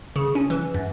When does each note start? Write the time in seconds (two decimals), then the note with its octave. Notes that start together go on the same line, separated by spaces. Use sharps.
0.16 C#3
0.35 C#4
0.50 E3
0.75 F#2